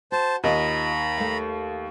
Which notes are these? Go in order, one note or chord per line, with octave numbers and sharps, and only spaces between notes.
F#4 C5 A5
D#2 F4 D#5 A#5 B5
A3 F5